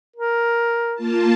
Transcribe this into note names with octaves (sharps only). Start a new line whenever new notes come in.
A#4
A#3 F4 A5